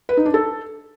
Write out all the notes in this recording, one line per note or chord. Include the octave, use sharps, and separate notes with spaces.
B4
D#4
D4
A4